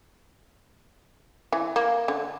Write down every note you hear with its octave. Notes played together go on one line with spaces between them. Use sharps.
E3
A#3
D3